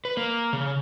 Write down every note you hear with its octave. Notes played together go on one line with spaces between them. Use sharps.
B4
A#3
C#3